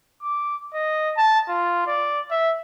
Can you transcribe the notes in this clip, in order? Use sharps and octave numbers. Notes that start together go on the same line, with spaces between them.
D6
D#5
A5
F4
D5
E5